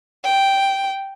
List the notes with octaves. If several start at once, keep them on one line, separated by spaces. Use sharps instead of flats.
G5